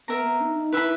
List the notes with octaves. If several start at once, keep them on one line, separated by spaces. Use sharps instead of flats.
B3 A#4 E5 A#5
B3
D#4
D#4
E4 B4 E5 B5